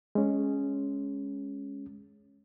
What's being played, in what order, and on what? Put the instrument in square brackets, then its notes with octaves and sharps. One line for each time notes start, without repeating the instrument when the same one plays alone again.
[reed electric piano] G#3 C#4